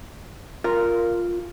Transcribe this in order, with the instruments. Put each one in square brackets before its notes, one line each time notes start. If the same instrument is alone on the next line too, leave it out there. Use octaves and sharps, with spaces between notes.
[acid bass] F4 [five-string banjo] A#4